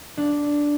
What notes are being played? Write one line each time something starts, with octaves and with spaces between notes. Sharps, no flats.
D4